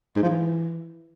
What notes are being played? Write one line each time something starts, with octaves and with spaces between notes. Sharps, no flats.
G#2
F3
E3